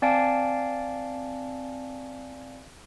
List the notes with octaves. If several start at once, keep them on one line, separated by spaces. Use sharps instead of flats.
C4 D5 F5 G#5 A5 D7